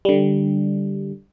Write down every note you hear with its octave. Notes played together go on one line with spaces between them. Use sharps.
D3 G3